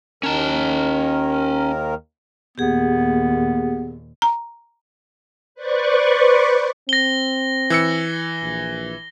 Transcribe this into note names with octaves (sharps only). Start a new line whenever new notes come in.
D#2 D#3 C#4 A#4 A5
D#2 A#2 B3 G4 G#4
A#5
B4 C5 D5 C#6
C4 A#6 G7
E3 E6 C#7
A#1